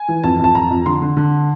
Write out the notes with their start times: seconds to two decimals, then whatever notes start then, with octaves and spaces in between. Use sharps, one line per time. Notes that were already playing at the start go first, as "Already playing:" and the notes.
Already playing: G#5
0.08 E3
0.24 F2 A5
0.39 F2 A5
0.55 F2 A#5
0.70 F2
0.86 D3 C6
1.02 D3
1.17 D3